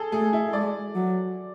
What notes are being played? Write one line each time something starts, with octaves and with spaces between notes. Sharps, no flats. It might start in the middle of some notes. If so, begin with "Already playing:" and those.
Already playing: G#4 A4
A3 G#4
E4
G#3 D5
F#3